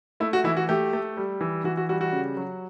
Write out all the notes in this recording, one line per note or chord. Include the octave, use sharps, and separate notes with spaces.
A3 E4
F#4
E3 E4
F#4
A3 G4
A3
G3
E3
E3 F#4
F#4
G3 F#4
F#4
C#3
F#3